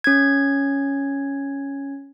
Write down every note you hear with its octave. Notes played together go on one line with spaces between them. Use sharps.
C#4 G#6